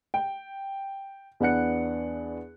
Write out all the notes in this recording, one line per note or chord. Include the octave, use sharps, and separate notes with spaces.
G5
E2 B3 D4 F#5 F#6 C#7